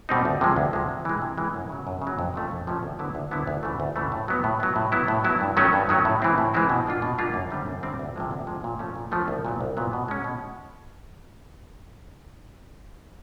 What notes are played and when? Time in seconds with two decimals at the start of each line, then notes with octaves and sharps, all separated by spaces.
0.09 B2 G3 C4 D#4
0.25 D2
0.41 C3 F3 G#3
0.56 D2
0.73 C3 F3 G#3
0.89 C3
1.05 E3 G#3
1.22 C3
1.38 E3 G#3
1.54 F#2
1.69 C#3 F#3
1.87 F#2
2.02 C#3
2.07 F#3
2.19 F2
2.34 C3 F3 A3 C#4
2.51 F2
2.67 C3 F3 A3 C#4
2.83 D2
2.99 D3 F#3 B3 E4
3.15 D2
3.31 D3 F#3 B3 E4
3.47 D2
3.63 C#3 E3 A3
3.80 D2
3.96 C#3 E3 A3
4.12 A2
4.28 F#3 B3
4.44 A2
4.60 F#3 B3
4.76 A2
4.92 F#3 B3 E4
5.08 A2
5.24 F#3 B3 E4
5.41 G2
5.57 D#3 F#3 A3 C#4
5.73 G2
5.89 D#3 F#3 A3 C#4
6.05 A2
6.22 E3 G#3 C4 E4
6.38 A2
6.54 E3 G#3 C4 E4
6.69 B2
6.86 G3 A#3 D4 F4
7.02 B2
7.18 G3 A#3 D4 F4
7.34 F#2
7.50 D3 G3 C4
7.66 F#2
7.83 D3 G3 C4
7.99 D2
8.16 C3 F3 G#3
8.31 D2
8.47 C3 F3 G#3
8.64 A#2
8.79 F3 A3 C#4
8.96 A#2
9.11 F3 A3 C#4
9.28 C2
9.45 A#2 F#3 B3
9.61 C2
9.77 A#2 F#3 B3
9.93 B2
10.08 G#3 C#4
10.24 B2